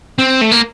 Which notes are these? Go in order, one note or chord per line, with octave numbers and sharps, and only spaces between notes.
C4
A3
A#3